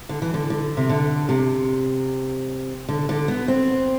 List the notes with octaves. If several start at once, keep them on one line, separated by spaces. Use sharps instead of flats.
D3
E3
D3
D3
C3
D3
C3
D3
D3
B3
C4